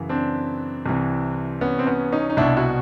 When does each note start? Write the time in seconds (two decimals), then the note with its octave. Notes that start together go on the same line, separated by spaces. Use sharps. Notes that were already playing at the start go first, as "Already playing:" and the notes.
Already playing: F#2 C#3 E3
0.09 C4 D4
0.86 C2 C3 E3
1.61 B3 C#4
1.79 C4
1.86 B3 C#4
2.12 C#4 D#4
2.30 D#4
2.37 C2 B2 D4 E4
2.57 E4 F#4